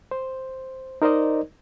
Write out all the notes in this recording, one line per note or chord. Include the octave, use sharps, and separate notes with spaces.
C5
D#4 A#4 C5 D5 D#5